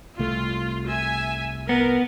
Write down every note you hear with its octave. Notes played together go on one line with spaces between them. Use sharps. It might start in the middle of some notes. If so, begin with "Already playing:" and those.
C2 A3 F4
E5 G#5
B3 A#4